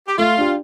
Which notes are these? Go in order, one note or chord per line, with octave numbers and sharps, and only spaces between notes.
G4
A3 F4
D4 G4